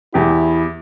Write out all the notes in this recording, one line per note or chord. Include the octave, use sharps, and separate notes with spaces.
E2 E4 G4